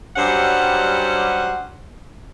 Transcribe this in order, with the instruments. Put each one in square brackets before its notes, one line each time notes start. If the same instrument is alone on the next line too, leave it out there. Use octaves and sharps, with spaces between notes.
[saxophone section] G2 F#3 G3 C#4 C5 F#5